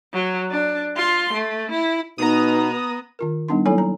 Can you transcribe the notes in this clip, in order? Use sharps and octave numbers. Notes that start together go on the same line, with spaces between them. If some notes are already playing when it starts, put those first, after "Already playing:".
F#3
D4
F4 C6
A3
E4
B2 B3 D#4 A#5 D#6
D#3 F4 A#4
G3 B3 D4 D#4 C6
F#3 A#3 E4 A4 C#5 G#5
A#5